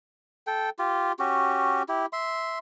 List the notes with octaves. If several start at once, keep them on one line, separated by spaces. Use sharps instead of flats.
A4 G5
F4 G4
C#4 F#4 G4
E4 G4
E5 C6